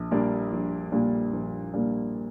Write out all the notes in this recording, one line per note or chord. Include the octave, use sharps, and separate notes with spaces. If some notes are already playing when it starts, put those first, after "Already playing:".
Already playing: A#1
A#2 G3 A#3 D4
A#1
A#2 G3 A#3 D4
A#1
A#2 G3 A#3 D4